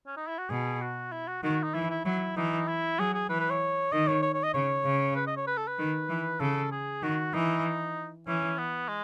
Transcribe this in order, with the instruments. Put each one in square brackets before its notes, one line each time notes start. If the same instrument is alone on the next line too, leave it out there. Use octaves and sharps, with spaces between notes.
[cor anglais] C#4
D#4
E4
F#4
[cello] B2 [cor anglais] G#4
[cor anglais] F#4
E4
F#4
[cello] D#3 [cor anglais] F#4
[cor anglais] D#4
[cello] E3 [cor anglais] E4
[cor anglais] E4
[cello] F#3 [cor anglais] E4
[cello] E3 [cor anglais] D#4
[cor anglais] E4
[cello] F#3 [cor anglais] G#4
[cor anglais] G#4
[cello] E3 [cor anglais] B4
[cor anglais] B4
C#5
[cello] D#3 [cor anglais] D#5
[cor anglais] C#5
C#5
C#5
D#5
[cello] C#3 [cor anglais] C#5
[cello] C#3
[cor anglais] B4
D#5
C#5
B4
A4
B4
[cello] D#3
E3
[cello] C#3 [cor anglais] A4
[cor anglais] G#4
[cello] D#3 [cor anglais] F#4
[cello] E3 [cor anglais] D#4
[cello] E3 [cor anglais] C#4
[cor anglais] B3
G#3